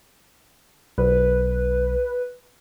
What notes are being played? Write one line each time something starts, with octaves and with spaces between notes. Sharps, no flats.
B1 B4